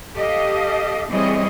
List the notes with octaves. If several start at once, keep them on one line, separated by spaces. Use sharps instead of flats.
G4 A4 D#5 F5
E3 G3 C4 G#4 C#5 D#5